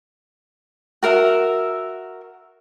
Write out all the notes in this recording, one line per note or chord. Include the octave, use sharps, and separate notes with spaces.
F#4 A#4 E5